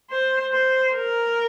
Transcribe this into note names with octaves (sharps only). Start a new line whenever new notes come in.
C5
C5
A#4